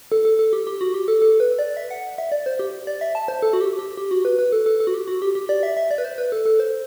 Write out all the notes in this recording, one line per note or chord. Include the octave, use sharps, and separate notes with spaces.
A4
A4
A4
G4
G4
F#4
G4
A4
A4
B4
D5
E5
F#5
E5
D5
C5
G4
D5
E5
A5
C5
A4
F#4
G4
G4
G4
F#4
B4
B4
A4
A4
A4
F#4
G4
F#4
G4
G4
D5
E5
E5
D5
B4
C5
B4
A4
A4
C5